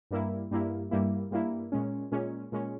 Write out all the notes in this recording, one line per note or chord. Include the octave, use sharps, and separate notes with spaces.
G2 G3 A#3 E4
G2 G3 A#3 E4
G2 G3 A#3 E4
G2 G3 A#3 E4
A#2 G#3 C#4
A#2 G#3 C#4
A#2 G#3 C#4